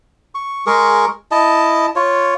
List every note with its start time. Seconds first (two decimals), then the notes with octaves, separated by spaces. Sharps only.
0.35 C#6
0.66 G#3 G#4 A#4 C#6
1.31 E4 D#5 A5
1.96 F4 C#5